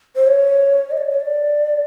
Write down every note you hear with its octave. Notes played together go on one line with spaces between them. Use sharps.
C5
C#5
D#5
D5
C#5
D5